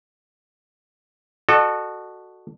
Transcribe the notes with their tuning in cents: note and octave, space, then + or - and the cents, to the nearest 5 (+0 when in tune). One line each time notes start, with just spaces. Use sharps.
F#4 +0 A4 +0 D#5 -45